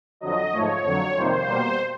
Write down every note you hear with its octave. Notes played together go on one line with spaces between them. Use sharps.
F2 D3 F#3 D#5
G#2 F3 A3 C#5
F2 D3 F#3
F2 C3 D#3 G3 A#3 C5
B2 G3 A#3